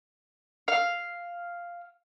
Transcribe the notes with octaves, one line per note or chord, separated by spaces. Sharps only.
F5